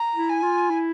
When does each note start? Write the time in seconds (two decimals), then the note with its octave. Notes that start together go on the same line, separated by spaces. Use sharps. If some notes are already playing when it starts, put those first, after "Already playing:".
Already playing: A#5
0.16 E4
0.29 G#5
0.43 F4
0.71 E4